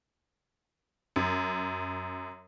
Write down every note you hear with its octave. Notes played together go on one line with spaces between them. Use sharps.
F#2